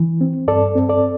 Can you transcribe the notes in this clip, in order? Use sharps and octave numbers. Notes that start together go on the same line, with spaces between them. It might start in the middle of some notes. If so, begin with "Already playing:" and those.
Already playing: E3
C4
G2 A4 D5
C4
A4 D5